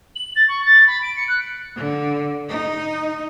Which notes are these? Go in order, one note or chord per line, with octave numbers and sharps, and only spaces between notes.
F#7
A6
C#6
A6
B5
D7
C#7
F#6
D3
D#4